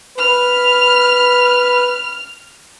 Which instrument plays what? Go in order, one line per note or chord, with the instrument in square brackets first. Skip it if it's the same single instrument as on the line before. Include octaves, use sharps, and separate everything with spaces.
[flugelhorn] B4 [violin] F6